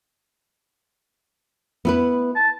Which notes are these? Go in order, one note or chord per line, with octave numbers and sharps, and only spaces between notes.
B3 E4 B4
A5